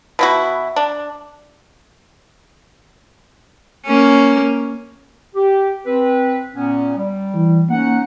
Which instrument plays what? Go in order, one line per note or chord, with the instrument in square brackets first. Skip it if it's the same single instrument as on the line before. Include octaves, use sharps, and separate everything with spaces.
[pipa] B2 E4 F#4
D4
[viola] A#3 C#4
[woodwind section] G4
C4 B4
A#2 B3 C#4
G3
[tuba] E3
[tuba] A#3 [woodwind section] C#4 D#4 F#5